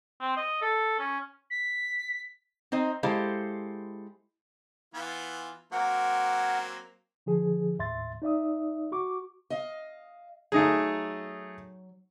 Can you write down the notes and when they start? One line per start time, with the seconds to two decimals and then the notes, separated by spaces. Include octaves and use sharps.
0.21 C4
0.37 D#5
0.62 A4
0.99 C#4
1.50 B6
2.72 C4 D#4 C5 D#5
3.03 G#3 E4 G4 A4 C5 F5
4.94 E3 B3 F4
5.72 F#3 A#3 C4 A#4 F#5
7.26 D3 F3 G#4
7.79 D#2 A2 E5 C6 A6
8.22 D#4 D5 E5 D#6
8.92 F#4 C#6 D6
9.50 D#5 F5
10.52 F#3 A3 D#4 G#4